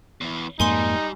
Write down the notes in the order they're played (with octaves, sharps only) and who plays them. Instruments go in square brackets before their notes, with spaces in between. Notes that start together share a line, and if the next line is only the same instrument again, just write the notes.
[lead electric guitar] E2 E3
[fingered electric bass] F2 G#2 A#3 [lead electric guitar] G3 [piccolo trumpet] D#4 [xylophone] G#5 C6 D#7